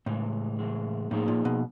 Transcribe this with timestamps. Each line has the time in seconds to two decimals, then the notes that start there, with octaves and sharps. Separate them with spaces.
0.06 A2 C#3 E3 G#3
0.59 C#3 E3 G#3
1.11 A2 F3 A#3 D#4 G#4
1.28 A#2
1.45 B2